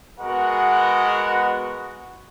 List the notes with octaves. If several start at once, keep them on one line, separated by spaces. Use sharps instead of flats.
G#3 B3 F#4 A#4 F#5